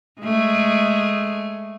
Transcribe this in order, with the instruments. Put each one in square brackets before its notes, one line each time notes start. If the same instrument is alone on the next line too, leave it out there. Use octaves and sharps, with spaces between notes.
[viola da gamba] G#3 A3